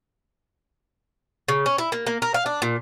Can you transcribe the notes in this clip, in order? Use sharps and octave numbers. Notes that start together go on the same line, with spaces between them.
C#3
C#4
E4
A#3
A#3
A#4
F5
D4
A#2